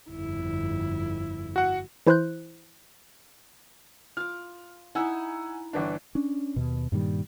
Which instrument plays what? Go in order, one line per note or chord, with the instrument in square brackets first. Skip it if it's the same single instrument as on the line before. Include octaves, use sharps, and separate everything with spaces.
[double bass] G1 F2 [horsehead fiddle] E4
[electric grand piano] F#4 F#5
[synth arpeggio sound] E3 E4 C5 C6 F#6 G6
[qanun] F4 D6 [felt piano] F6
[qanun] D#4 E4 [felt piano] F#5 G#5 E6
[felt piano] G1 E3 D4
[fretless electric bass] C#4 D4
D#2 B2
G2 A#2 D#3 G3